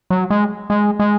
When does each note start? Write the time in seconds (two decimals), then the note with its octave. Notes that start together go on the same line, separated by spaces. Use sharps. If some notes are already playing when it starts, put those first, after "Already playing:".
0.10 F#3
0.30 G#3
0.70 G#3
0.99 G#3